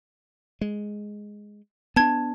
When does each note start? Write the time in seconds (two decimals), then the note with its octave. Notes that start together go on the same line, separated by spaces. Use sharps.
0.61 G#3
1.96 B3 D4 A5 G#6